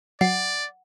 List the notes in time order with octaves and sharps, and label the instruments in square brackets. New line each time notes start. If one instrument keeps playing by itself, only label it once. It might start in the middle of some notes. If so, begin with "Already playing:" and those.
[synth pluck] F#3 [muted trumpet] D5 [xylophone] F#5